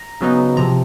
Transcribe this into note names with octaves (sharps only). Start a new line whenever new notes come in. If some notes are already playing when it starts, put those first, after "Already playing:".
Already playing: A#5
C#3 F#3 B3 D#4
C3 F3 A#5